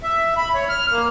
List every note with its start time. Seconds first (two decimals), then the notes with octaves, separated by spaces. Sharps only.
0.03 E5
0.37 B5
0.54 C#5
0.69 F6
0.91 A#3